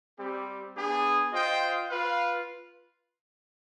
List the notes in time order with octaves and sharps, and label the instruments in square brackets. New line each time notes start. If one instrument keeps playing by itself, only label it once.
[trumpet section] G3 C4 G4
B3 D4 G#4
F4 C5 D#5 G5
F4 B4 F5